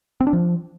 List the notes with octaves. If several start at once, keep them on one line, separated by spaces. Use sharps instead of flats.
C4
D4
F3